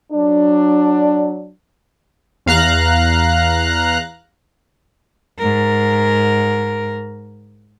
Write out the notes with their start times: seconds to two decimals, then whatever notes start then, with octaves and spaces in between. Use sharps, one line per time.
0.12 F#3 D4
2.46 E2 F5 A#5 F#6
5.38 G#2 A#4